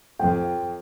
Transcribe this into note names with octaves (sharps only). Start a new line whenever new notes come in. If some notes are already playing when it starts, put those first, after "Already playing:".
F2 G5